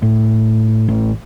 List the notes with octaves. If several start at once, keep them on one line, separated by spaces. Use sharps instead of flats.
A2
A1